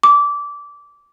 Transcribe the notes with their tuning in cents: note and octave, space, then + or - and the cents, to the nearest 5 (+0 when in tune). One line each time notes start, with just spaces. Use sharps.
D6 -20